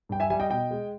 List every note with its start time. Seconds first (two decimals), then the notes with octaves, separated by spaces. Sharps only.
0.09 G2 G5
0.20 E5 G#5
0.30 G3 E5 G#5
0.40 D#5 G5
0.50 B2 D#5 G5
0.71 G#3